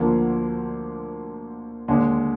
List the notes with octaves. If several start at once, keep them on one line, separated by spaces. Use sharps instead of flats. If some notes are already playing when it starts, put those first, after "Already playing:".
Already playing: D2 D3 F3 A#3
D#2 D3 G#3